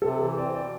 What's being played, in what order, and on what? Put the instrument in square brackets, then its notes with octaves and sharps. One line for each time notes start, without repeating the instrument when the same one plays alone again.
[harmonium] C3 [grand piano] A4
[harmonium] E3 [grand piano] A4
[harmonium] C4 [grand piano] D5
[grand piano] C5
[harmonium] B2 [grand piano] D5